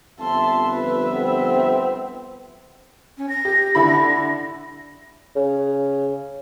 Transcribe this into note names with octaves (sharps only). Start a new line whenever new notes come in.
G1 F2 E5 A5 C6
B4
B3 C4
C#4
A#6
G4
D3 E4 B5
C#3